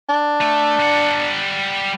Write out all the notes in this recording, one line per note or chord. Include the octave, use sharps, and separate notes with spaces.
D4
A3
G3 F#5